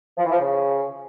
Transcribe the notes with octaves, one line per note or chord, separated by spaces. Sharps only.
F3
E3
F3
C#3